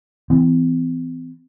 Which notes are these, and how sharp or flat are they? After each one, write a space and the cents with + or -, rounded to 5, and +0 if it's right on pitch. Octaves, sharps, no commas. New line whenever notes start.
E3 +0 C4 -40